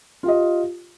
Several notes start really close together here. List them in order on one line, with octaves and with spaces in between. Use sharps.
F4 G4 D#5